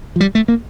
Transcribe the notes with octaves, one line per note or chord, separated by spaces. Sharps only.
F3
G3
A3
A#3